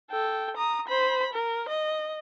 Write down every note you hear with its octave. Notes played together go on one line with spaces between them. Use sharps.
A4 G5
A#5 D#6
C5 B5
A#4
D#5